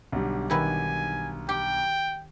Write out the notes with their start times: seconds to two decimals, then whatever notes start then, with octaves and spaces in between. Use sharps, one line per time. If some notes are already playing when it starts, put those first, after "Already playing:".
0.12 B1 D3 G3
0.50 D#3 E4 B4 G#5
1.49 G4 G5